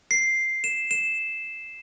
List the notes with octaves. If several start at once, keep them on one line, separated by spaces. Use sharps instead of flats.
C7
E7
E7